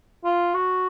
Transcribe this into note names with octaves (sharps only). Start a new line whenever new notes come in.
F4
F#4